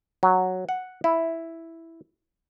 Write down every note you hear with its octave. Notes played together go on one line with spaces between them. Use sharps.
F#3
F#5
E4